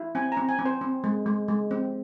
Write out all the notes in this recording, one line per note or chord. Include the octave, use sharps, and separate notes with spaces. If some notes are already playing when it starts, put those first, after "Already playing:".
Already playing: E4
C4 G#5
A#5
C4
G#5
C4
C5
C4
G#3
G#3
G#3
C4